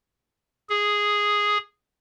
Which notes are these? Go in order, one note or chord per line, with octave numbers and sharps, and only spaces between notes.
G#4